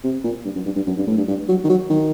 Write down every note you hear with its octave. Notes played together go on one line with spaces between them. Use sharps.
C3
A#2
G2
F#2
G2
G2
F#2
G2
A2
G2
G2
F#3
D#3
F#3
D#3